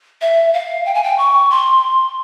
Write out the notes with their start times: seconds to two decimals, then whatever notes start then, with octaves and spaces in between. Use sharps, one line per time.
0.21 E5
0.54 F5
0.86 G5
0.94 G#5
1.03 G5
1.18 C#6
1.51 C6